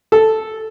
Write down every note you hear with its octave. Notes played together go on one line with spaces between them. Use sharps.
A4